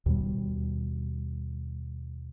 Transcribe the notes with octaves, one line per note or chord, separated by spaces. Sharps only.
D#2 B2 G3